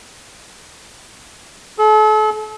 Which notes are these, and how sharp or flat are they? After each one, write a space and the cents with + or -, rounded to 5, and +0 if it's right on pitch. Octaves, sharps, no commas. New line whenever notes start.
A4 -40